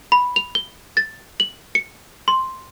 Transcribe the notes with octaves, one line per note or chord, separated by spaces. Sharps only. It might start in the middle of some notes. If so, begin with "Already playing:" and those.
B5
F7
G7
A6
F#7
C#7
C6